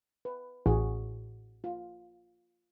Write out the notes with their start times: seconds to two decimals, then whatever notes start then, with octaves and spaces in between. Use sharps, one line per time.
0.25 B4
0.66 A1 F#4 G#4
1.64 F4